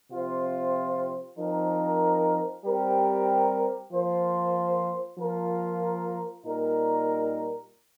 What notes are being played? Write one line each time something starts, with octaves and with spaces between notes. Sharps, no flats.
C3 F3 C4 F4 C5
F3 C4 D#4 A#4
G3 C4 G4 A#4
F3 A#3 F4 C5
F3 A#3 F4 A#4
A#2 G3 D#4 A#4